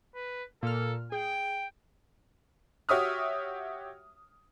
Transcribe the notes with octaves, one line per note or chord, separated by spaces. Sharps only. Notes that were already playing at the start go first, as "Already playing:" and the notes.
B4
A#2 A4 F6
G#4 G5
F#4 G4 C#5 E5 D#6 F6